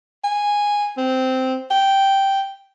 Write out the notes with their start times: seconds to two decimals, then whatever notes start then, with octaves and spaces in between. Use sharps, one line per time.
0.24 G#5
0.97 C4
1.71 G5